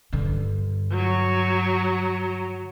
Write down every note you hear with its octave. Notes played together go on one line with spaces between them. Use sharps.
G2 D3
F#3